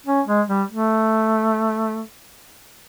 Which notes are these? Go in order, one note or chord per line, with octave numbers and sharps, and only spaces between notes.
C#4
G#3
G3
A3